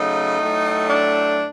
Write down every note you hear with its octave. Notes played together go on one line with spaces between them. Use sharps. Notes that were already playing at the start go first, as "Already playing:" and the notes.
Already playing: C#3 F#3 A3 D#4
A2 F#3 A3
D4